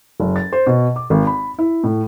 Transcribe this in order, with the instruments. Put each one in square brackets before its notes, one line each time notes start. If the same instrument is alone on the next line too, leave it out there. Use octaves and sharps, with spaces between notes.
[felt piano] F#1
A6
C5
B2
D6
G#1
B5
E4
A2